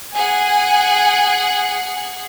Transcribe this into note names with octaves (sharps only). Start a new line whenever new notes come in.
G#4 F#5 G#5